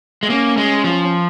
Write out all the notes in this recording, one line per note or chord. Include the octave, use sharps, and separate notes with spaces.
G#3
A#3 C#4
G#3
F3